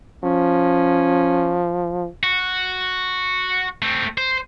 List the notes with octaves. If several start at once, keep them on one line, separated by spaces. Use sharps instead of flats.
F3 C#4
F#4
A3 C4
C5